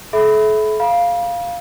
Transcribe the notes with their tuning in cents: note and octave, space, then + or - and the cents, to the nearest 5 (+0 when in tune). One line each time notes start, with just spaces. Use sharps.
A4 -40 E5 -10 B5 +10
F5 +0 B5 -40